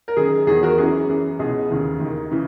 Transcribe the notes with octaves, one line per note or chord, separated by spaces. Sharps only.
A#4
F#2 D#3 G#4
E2 D#3 G#4
F#4 A#4
F#2 E3 G#4
F#2 E3
C#2 B2 G#4
D#2 C#3 E3
D#2
D#3
C#3 E3